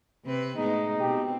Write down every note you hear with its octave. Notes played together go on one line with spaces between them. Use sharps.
C3 C4 B4
A2 G#3 B3 D#4
B2 C4 G4